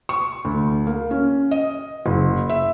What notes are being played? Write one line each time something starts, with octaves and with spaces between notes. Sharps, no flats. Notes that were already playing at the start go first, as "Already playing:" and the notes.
C#6
D2
A#3
C#4
D#5
F#1
E5